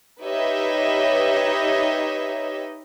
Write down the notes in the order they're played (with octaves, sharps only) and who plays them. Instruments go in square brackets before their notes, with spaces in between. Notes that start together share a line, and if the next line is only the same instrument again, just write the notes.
[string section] D#4 G4 B4 C#5 D#5 E5